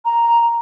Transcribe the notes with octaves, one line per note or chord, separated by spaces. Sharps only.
A#5